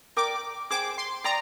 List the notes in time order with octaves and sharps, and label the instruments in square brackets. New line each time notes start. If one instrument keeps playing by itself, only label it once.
[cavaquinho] A#4 D5 G5 [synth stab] D6
[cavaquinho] G#4 C5 G5 [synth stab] D6
[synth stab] C6
[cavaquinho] D5 G5 C6 D#6 [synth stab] A#5